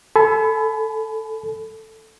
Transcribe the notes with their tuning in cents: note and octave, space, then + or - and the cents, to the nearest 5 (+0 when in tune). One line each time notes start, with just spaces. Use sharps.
A4 +5 G#5 +45 B5 +20